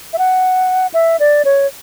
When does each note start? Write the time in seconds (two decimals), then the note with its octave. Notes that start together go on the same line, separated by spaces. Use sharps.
0.13 E5
0.18 F#5
0.94 E5
1.20 D5
1.45 C#5